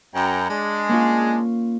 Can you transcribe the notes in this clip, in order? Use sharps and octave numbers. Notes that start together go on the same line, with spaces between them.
F#2 G5 A#5
G#3 D4
A#3 C#4 F4